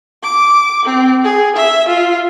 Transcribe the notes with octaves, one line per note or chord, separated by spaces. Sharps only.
D6
C4
G#4
E5
F4